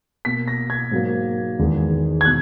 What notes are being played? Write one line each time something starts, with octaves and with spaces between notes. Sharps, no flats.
B2 A#3 B6
A#6
G#6
G#2 F#3 A#3
E2 D#3 G#3 B3
G#6
B2 F#6